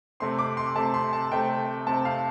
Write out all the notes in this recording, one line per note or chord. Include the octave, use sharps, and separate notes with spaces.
C3 A3 C4 C6
D6
C6
C3 A3 C4 A5
C6
A5
C3 A3 C4 G5
C3 A3 C4 A5
F5